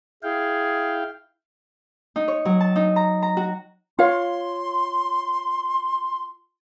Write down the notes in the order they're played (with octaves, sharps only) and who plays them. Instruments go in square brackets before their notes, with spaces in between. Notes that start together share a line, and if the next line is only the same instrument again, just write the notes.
[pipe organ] E4 F5 G5 [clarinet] G#4
[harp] D#4
C#5
F#3
A5
D#4
A#5
A#5
F#4
[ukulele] F4 C#5 F5 [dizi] C6